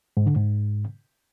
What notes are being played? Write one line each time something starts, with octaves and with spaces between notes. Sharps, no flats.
G#2
D3
G#2